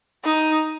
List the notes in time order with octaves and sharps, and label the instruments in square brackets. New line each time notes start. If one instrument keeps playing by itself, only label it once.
[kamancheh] D#4